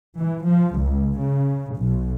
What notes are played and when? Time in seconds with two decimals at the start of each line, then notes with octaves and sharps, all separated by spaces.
0.18 E3
0.47 F3
0.78 C#2
1.20 C#3
1.77 B1